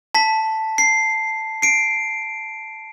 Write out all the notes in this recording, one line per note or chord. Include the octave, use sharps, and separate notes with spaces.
A5 B6
C7
C7 D7